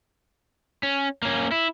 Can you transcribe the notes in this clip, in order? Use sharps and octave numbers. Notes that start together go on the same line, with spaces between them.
C#4
A#3 C#4
E4